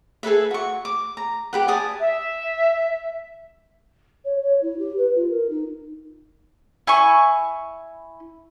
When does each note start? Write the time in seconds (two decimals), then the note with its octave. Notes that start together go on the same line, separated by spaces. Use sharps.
0.23 G#4 A4 B4 E5
0.51 F#4 C#6
0.85 D6
1.17 A#5
1.53 G4 B4 F#5
1.68 D5 G#5 A5 D#6
1.99 E5
4.25 C#5
4.42 C#5
4.62 E4
4.79 G4
4.98 B4
5.16 F4
5.30 A#4
5.50 D#4
6.87 E4 G#5 C#6